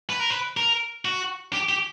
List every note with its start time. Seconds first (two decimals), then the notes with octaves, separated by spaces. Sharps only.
0.10 B4
0.20 A#4
0.30 B4
0.57 A#4
1.05 F#4
1.53 G4
1.69 G4